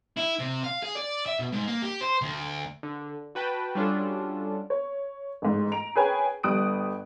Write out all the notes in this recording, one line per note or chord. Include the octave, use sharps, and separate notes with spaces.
E4
C3
F5
G#4
D5
E5
B2
G#2
A#3
G4
C5
D2
D3
F#4 B4 G5 A5
G3 C#4 D4 F4 F#4 A4
C#5
A1 G#2
A#5 D7 F7
G#4 A#4 B4 C#5 G5 G#5
G1 G3 D#6 F#6 D7